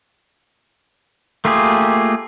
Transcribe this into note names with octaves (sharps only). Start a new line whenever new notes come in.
A3 A#3 F4 G4 G#4